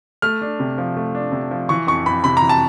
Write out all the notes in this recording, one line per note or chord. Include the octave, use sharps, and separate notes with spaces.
A3 F6
D4
C3
F3
A3
D4
C3
F3
E3 C#6
F2 C#6
F2 B5
C3 B5
A#5
E3
A5